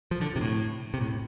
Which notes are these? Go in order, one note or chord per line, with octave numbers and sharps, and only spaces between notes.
F3
D3
C3
A2
C3
A2